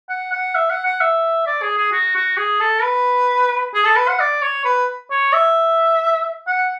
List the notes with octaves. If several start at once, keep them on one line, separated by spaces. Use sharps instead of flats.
F#5
F#5
E5
F#5
F#5
E5
D5
G#4
G#4
F#4
F#4
G#4
A4
B4
G#4
A4
B4
F#5
D5
C#5
B4
C#5
E5
F#5